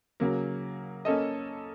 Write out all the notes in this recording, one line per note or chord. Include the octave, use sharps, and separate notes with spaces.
C#3 F#3 A#3
A#3 C#4 A4 D#5